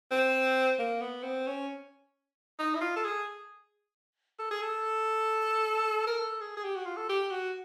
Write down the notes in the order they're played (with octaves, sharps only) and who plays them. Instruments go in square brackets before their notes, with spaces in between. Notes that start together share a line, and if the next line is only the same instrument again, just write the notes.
[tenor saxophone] C4
A#3
B3
C4
C#4
D#4
E4
F4
A4
G#4
A4
G#4
A4
A#4
A4
G#4
G#4
G4
F#4
F4
A4
G4
F#4